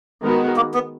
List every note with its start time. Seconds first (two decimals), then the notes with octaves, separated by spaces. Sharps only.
0.22 D#3 G#3 B3 F#4 A#4
0.56 A#3
0.74 B3